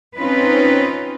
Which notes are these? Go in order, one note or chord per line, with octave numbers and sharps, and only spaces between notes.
C4 C#4 D#4 F4 B4